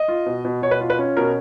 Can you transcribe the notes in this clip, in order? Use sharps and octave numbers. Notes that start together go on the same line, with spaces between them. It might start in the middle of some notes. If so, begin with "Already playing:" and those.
Already playing: D#5
F4
B2
B2
B2 C#5
B4
F4
B4
C#4
B2 A#4